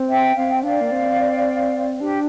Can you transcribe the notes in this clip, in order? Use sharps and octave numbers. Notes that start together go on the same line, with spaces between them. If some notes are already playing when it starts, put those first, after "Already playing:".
Already playing: C4
E5 G5
C4 F5
G5
D4 D5 F5
A#3
C4
D4 G4